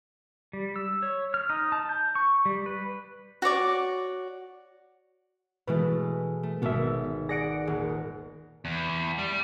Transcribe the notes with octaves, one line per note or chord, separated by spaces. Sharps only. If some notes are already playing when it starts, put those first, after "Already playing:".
G3
E6
C#5
F6
D#4
A5
G6
C#6
G3
B4
F#4 C#5 D5 C#6
B2 E3 G#3 A3 B4
A3
G#1 B2 B3 E5
G#4 D5 F#5 A#6 C#7 D7
D#1 G#4 F#5
E2
G3